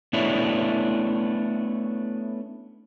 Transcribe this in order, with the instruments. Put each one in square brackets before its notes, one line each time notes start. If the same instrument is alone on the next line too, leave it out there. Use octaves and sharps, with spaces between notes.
[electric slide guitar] A3 B3 C#4 D4 E4